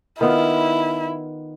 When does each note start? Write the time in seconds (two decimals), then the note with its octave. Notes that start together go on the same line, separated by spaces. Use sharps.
0.21 D#3 B3 E4 F4